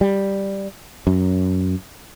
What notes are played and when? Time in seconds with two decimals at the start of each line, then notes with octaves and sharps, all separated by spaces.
0.01 G3
1.07 F#2